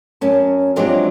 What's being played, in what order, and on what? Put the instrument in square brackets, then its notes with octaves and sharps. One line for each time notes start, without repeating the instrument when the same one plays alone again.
[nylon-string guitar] F#2 C#4 A5
F3 F#3 G#3 C4 D4 G4